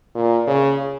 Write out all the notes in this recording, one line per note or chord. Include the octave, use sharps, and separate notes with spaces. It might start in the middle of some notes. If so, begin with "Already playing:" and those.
A#2
C#3